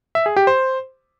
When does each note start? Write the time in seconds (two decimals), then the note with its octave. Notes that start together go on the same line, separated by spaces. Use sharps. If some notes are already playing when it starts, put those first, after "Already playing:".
0.15 E5
0.26 G#4
0.37 G4
0.47 C5